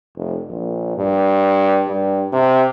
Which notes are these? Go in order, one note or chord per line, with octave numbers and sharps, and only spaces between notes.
F1
A#1
G2
G2
C3